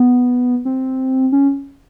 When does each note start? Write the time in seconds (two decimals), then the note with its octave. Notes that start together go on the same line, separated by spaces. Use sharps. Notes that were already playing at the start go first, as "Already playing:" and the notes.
Already playing: B3
0.65 C4
1.32 C#4